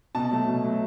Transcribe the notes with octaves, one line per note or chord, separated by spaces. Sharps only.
B2 A5
F#3 A3
B2
F#3 A3